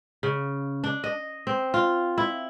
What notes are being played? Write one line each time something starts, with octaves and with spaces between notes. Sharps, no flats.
C#3
D4
D#5
C4
F4
E4